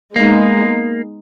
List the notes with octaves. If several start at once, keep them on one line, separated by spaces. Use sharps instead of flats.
G#3 A#3 B3 D#4